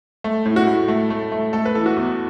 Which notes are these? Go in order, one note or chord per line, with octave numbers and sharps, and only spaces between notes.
A3
A2
F#4
A2
A3
A3
A3
A3 A4
B4
E3 A4
F#4
E2